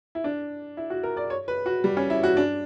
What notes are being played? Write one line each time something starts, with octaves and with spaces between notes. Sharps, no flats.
E4
D4
E4
F#4
A#4
D5
C#5
B4
F#4
G3
C#4
E4
F#4
D4